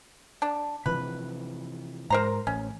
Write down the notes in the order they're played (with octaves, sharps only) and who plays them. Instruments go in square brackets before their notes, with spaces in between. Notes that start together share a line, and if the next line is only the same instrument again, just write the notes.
[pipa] D4
[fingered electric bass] C3 E3 F3 [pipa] B4
[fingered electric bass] G#2 [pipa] A#4 C5 A#5
[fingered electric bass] A1 [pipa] C#4